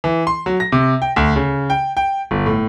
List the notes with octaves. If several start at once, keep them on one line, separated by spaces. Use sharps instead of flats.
E3
C6
F#3
A#6
C3
G5
D2
C#3
G5
G5
G1
A2